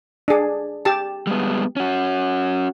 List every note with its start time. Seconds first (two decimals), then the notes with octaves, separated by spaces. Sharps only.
0.28 D4 G#4
0.85 G4 A5
1.27 G3 G#3 B3
1.76 C#4 F#4